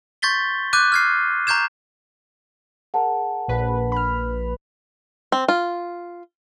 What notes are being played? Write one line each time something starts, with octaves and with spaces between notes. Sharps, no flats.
C6 C#6 G6 A6 B6 G7
D6 F#6 G6 D#7
F6 G#6 C7
A#5 C#6 G6 G#6 E7
G#4 A#4 F#5 A5
A#1 A#2 B4
B5 F6
C4
F4